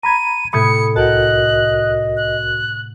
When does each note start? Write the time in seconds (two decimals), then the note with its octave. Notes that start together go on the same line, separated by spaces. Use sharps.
0.03 A#5 B5 G#6 D#7
0.53 A2 C3 A3 B5 D#6 G#6 C#7
0.96 C2 F#4 A#4 D#5 F#5 G5 A5 F#6
2.17 F#6